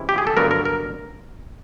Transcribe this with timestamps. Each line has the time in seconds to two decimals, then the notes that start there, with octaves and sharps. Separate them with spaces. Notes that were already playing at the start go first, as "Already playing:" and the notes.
Already playing: C3 E3 G#3 C#4 E4
0.09 G4
0.18 G#4
0.27 A4
0.37 G2 D3 F#3 B3 A#4
0.51 A#4
0.65 A#4